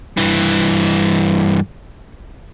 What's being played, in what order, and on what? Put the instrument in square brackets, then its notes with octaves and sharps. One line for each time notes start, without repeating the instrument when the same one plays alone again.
[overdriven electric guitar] G2 E3